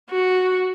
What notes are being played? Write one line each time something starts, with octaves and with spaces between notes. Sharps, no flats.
F#4